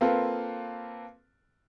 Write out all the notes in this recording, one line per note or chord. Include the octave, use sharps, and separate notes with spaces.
A#3 C4 F4 A4 B4